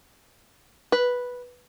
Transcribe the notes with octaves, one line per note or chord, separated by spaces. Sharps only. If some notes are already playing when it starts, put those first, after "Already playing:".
B4